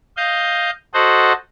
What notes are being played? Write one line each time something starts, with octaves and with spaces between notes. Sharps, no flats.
D#5 F5 G6
F#4 A4 C5 D#5 F#5